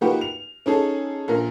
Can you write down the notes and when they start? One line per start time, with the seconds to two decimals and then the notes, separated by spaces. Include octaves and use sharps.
0.01 F3 A#3 D#4 F#4 G4 B4
0.21 F7
0.66 C#4 D#4 G#4 A4
1.28 A#1 A#2 A#4